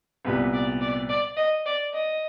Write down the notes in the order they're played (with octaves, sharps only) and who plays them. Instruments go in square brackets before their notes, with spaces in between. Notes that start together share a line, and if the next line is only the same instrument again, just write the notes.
[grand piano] C2 A#2 G3 B3 [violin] B4
[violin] D5
D5
D5
D#5
D5
D#5